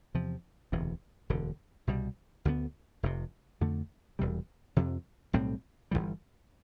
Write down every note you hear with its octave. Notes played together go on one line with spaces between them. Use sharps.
E2 C3 F3
E1 D2 C3 E3
E1 D2 D3
C2 B2 G3
D2 D3 F3 B3
F1 F2 C3
F2 D3 A3
E1 E2 C3 G3
F2 C3 F3
B1 A2 G3 C4
G1 F2 E3 G3